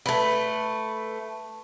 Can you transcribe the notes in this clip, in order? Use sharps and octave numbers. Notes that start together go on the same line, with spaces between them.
A3 B4